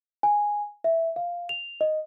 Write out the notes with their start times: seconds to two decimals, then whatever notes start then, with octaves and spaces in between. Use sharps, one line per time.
0.23 G#5
0.84 E5
1.16 F5
1.49 F7
1.81 D#5